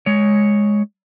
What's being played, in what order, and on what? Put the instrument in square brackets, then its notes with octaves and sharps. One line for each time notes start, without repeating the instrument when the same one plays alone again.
[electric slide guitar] G#3 C#5